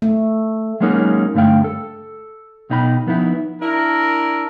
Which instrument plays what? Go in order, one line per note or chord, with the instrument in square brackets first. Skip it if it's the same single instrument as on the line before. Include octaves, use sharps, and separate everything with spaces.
[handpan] A3
[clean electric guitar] F#3 G#3 A#3 C#4 D#4 F#4
G2 D3 A3 F5 G5
A4
B1 B2 D#4 G5 B5
F3 B3 D#4 E4
[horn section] D4 E4 A#4